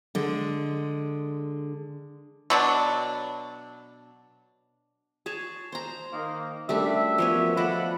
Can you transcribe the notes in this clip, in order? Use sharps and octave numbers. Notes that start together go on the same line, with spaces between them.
D3 G#3
B2 F#3 D4
G#4 C#5 A5
C5 A#5
D#3 A#3
F#2 G3 A3 D4 E5
F3 B3 C#5
F4 A4 D5 D#5 F#5 B5